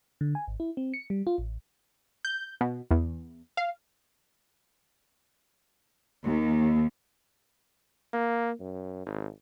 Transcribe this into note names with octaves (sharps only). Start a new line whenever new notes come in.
D3
G#5
G#1
E4
C4
C#7
G3
F4
A1
G6
B2
E2
F5
D#2
A#3
F#2
G#1